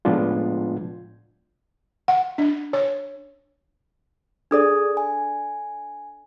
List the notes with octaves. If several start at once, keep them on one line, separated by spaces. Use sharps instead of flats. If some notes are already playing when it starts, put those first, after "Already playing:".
A2 F3 G#3 B3 D4 F4
F#5
D4
C#5
D4 G#4 A4 D5 D#6 G#6
G#5